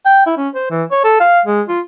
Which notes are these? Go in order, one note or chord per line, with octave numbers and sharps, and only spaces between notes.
G5
E4
C#4
C5
E3
C#5
A4
F5
G#3
F4